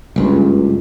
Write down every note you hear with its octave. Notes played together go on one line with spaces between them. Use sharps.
F#1 C#2 G2